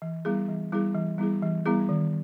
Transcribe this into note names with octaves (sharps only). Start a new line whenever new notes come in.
E3
G3 B3 E4 G#4
E3
G3 B3 E4 G#4
E3
G3 B3 E4 G#4
E3
G3 B3 E4 G#4
D#3